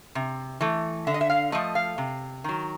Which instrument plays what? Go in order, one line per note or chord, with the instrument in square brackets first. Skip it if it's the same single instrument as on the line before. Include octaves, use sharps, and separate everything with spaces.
[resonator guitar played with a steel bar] C3
E3 A3
D3 E5
D#5
E5
F5
F3 A3 D#5
F5
C3
D#3 F#3